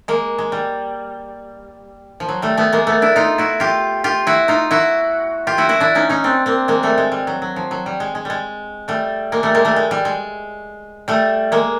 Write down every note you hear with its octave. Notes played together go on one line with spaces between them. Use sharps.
G#3 A#3
G#3
G3
F3
F#3
G3 A3
A3 B3
G#3 A#3
A3 B3
D4 E4
D#4 F4
E4 F#4
F4 G4
F4 G4
E4 F#4
D#4 F4
E4 F#4
F4 G4
E4 F#4
E4 F#4
D4 E4
C#4 D#4
C#4 D#4
C4 D4
A#3 C4
G#3 A#3
G3 A3
G#3
G3
F#3
F#3
F3
F#3
G3
G#3
G#3
G3 G#3
G3 A3
G#3 A#3
G3 A3
G#3 A#3
G3 A3
G#3
G3
G#3
G3 A3
G#3 A#3